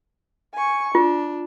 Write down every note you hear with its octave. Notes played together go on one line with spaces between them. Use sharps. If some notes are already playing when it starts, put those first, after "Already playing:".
G#5 C#6
D4 F4